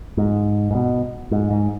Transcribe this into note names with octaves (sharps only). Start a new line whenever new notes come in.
G#2
G#2
B2
G#2
G#2